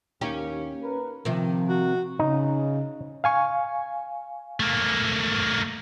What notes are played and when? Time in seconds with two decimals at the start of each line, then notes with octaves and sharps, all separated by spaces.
0.21 D#2 A#3 C#4 D#4 G4
0.81 A#4 B4
1.25 C3 D#3 F3
1.69 F#4
2.19 C#3 D#4
3.24 F5 G#5 C#6
4.60 A3 A#3